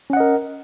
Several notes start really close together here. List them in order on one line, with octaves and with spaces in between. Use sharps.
C#4 F#5 D#5 A#4